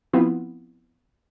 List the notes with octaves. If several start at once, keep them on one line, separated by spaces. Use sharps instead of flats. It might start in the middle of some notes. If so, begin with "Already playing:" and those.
F3 B3 C4 E4 F4